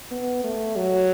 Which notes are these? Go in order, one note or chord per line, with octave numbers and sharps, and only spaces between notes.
B3
A3
F#3